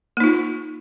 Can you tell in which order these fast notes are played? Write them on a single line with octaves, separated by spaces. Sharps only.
A#3 D#4 F4